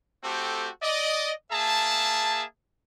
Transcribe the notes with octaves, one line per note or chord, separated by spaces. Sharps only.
A3 C4 F#4 G4 A4
D5 D#5
A#3 G#4 E5 A5